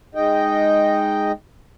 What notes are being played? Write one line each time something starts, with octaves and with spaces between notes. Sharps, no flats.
G#3 D#4 D#5 G5